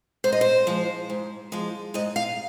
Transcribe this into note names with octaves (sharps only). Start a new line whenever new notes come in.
G#2 C5
D#5
C5
F3 G#3
G#2
F3 G#3
G#2 D#5
F5